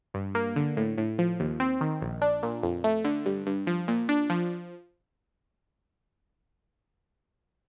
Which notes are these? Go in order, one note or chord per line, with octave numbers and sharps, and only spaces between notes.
G2
A#3
D3
A2
A2
F3
D#2
C4
D#3
A#1
D4
A#2
F2
A3
D3
G2
G2
F3
A#2
D4
F3